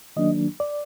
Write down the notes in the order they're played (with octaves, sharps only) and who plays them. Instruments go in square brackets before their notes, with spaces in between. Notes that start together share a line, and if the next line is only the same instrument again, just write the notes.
[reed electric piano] D#3 F#3 A#3 D4 D#5
D5